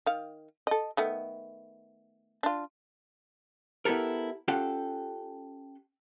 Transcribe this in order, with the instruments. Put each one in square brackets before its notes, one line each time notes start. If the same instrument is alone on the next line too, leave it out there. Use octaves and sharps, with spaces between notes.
[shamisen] D#3 F5
A4 D#5
D#3 A3 B3
D4 F4
[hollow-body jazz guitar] B3 E4 G4 A4 A#4
C#4 F4 G4 A4 F#5 G5